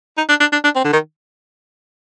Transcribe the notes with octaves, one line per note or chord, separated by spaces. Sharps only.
D#4
D4
D4
D4
D4
C4
D3
D#3